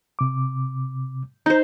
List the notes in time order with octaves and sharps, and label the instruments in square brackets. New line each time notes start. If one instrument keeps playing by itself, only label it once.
[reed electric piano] C3 D6
[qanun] D#4 C5 [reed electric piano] A#5